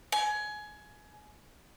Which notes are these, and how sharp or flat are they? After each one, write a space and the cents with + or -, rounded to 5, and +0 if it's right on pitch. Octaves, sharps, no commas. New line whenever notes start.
G#5 +20